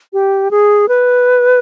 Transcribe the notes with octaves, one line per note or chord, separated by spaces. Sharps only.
G4
G#4
B4